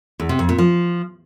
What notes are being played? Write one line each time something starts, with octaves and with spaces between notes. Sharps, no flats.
E2
C3
F2
A#2
F3